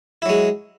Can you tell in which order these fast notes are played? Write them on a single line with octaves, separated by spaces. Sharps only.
E4 F#3 G#3